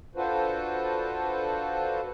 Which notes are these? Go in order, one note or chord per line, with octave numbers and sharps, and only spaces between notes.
D4 F4 F#4 A4 B4 C5